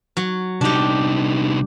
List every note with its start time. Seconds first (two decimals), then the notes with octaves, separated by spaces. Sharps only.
0.17 F#3
0.61 C2 D4 D#4 G4